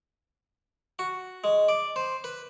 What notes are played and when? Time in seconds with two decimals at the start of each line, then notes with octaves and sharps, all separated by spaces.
0.99 F#4
1.44 G#3
1.69 D5
1.96 C5
2.24 B4